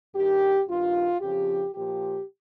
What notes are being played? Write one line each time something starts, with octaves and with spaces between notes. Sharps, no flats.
G2 D#3 G4
G2 D#3 F4
F2 C#3 F3 G4
A#2 F3 G4